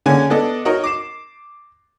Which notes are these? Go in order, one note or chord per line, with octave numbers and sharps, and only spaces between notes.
D3 A#3 C#4 G#4 G#5
B3 D4 A4 D#5
D#4 F#4 A#4 C#5 D#5
D6 C7 E7